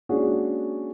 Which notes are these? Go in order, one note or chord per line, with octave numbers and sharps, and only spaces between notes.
G#3 A#3 C#4 D4 F#4 G#4